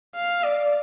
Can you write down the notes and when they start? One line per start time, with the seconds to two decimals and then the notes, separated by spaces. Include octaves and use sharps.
0.15 F5
0.44 D5